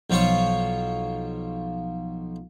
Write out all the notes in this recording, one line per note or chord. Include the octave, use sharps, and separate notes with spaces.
B1 F3 F4 C#5 C#6